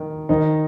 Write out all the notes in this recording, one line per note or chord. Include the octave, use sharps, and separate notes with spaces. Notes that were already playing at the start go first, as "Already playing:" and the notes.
Already playing: D#3
D#3 D#4